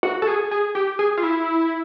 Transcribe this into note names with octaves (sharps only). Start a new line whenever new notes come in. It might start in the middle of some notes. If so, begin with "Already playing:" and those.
F#4
A4
G#4
G#4
G4
G#4
F4
E4